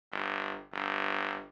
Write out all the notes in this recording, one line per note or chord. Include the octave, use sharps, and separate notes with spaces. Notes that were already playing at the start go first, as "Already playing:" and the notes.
G1
G1